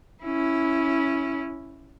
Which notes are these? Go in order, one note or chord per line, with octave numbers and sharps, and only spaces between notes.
C#4 E4